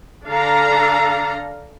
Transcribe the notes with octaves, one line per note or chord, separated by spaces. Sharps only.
D3 D4 A4 F5 A#5